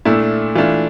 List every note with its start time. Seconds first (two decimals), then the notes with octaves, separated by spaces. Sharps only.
0.05 A#2 A3 D4 E4
0.55 E3 A3 D4 F4